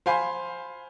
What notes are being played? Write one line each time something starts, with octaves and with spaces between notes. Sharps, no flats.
C5 F5 G#5 B5 C6